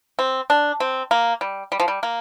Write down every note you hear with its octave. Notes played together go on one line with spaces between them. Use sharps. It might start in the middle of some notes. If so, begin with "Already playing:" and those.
C4
D4
C4
A#3
G3
G3
F3
G3
A#3